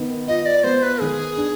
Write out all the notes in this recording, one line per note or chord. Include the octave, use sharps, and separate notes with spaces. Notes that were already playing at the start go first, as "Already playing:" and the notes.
Already playing: D#3 B3
F4 D#5
D5
B3 C5
B4
D#3 G#4
D4